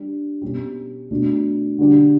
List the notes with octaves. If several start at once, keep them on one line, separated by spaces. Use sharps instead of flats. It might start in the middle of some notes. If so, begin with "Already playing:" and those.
Already playing: G3 D4 G4
B2 G3 C#4 G4
B2 A3 D4 F#4
D3 G3 D4 G4